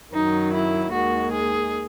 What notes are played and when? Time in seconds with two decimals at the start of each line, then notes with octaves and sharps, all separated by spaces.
0.12 F#2 D#3 F#3 D#4
0.53 E4
0.92 D#2 D#3 G#3 F#4
1.31 G#4